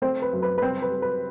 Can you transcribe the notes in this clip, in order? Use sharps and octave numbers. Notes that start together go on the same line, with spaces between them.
A3 C4 C5
B4
F#2
B4
B4
G3 C4 C5
B4
G3
B4